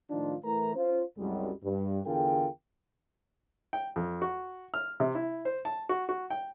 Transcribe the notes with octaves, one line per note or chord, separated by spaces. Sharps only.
A2 D#3 F3 D4 D#4 F4
A2 E3 A#4 A#5
C#4 F4 C5
C2 F#2 G3 G#3
G2
E2 D3 F4 G#4 A#4 G5
G5
F2
F#4
F6
C3
E4
C5
A5
F#4
F#4
G5